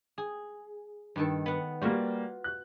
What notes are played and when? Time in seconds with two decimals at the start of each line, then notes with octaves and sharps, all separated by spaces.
0.18 G#4
1.16 G2 D#3 A4
1.46 B3 F#5
1.81 G3 A#3 F4 F#4 F#5
2.44 F#6